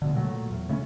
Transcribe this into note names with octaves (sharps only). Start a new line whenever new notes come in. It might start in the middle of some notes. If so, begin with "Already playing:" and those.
D2 B2 D3
A#2 F#3 A3
E2
C#3 A3 B3 C#4